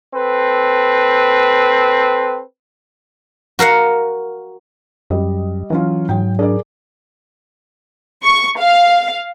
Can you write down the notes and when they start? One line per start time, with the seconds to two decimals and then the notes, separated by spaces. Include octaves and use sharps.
0.14 C4 A4 B4
3.59 F#4 A#4 F5 F#5
5.10 F#2 G3 D#5
5.70 E3 F#3 C#4 F4
6.09 G#2 F#3 G5
6.39 D4 G#4 A#4 D5
8.24 C#6
8.59 F5